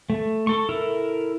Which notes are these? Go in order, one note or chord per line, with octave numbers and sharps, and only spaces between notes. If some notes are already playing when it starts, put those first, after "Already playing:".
A3
A4 C#6
E4 A4 A#4